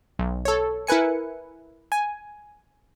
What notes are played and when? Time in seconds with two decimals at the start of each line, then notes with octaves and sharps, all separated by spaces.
0.19 B1
0.45 A4 C#5
0.87 E4 A#4 B4 G#5 C#7
1.92 G#5